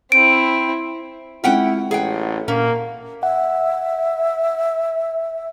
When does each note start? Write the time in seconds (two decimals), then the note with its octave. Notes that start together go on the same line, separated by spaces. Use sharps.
0.12 C4 E4 D7
1.44 G#3 C4 C#4 E4 F4 F#5 G5
1.91 A1 G#4 F#5 G5
2.48 A#2 A#3 C#4
3.23 E5 F#5